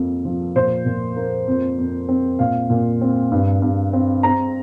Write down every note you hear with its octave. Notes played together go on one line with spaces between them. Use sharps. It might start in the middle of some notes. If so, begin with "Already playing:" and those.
Already playing: F2 A#3
F3
A#2 C5
A#2
A#3
F2
F2
C4
A#2 F5
A#2
C4
G2
G2
C4
C4 A#5